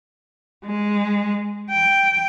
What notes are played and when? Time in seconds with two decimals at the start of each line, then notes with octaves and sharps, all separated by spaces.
0.65 G#3
1.71 G5